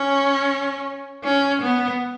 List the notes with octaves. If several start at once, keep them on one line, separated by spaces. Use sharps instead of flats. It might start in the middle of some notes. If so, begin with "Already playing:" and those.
Already playing: C#4
C#4
B3